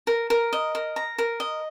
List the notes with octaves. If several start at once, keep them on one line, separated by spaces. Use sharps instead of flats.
A#4
A#4
D#5
A#4
A#5
A#4
D#5